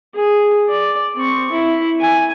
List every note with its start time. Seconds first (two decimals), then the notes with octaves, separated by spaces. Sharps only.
0.14 G#4
0.69 D5
1.16 C4 C#6
1.52 E4
2.00 G#5